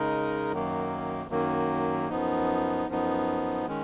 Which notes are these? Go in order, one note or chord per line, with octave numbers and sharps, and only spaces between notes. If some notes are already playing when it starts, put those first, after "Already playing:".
Already playing: C#3 G#3 D#4 A#4
F#2 D#3 F#3 A#3
F#2 D#3 F#3 A#3
F#2 F3 B3 D#4
F#2 F3 B3 D#4
D#3 G#3 C#4